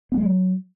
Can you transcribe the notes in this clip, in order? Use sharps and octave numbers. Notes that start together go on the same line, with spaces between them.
B3
G#3
F#3